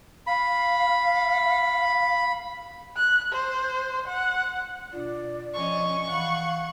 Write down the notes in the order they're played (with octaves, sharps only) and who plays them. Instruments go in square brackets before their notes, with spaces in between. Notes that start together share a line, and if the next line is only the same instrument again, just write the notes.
[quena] F5 [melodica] B5
[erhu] F#6
C5
F#5
[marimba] B2 D4 F4 [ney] D5
[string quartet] F3 C#4 D#5 [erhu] C#6
[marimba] E3 B5 [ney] F5 [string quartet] F#5